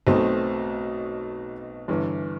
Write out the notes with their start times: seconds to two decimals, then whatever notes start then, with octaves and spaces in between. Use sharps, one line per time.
0.07 B1 B2 A3 C4
1.88 G1 G2 E3